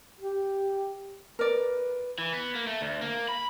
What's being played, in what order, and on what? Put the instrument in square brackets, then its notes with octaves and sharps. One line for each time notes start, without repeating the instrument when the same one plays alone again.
[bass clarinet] G4
[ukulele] A#4 D5 [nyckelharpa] B4
[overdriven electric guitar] E3
B3
A#3
A3
D2
A#3
B5